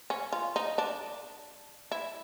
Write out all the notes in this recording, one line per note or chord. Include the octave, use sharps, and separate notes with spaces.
C#4
F4
D#4
D4
E4